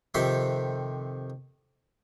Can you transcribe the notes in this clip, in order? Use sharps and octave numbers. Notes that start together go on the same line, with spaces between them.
F2 C3 D#3 E5 C6